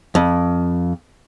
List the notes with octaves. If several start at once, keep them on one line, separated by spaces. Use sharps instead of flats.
F2